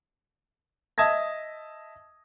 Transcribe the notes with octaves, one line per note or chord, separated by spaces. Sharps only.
D#5 E5 A5 D#6 G#6 A#6